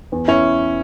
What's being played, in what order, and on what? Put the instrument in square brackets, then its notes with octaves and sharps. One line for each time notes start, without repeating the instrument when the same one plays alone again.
[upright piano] E2
[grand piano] C#4 [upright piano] E4